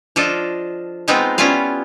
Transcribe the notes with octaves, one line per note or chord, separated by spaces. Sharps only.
F3 D4 F4 A4 D#5
G#3 B3 C4 D#4 F4
G3 B3 C#4 E4 F4 F5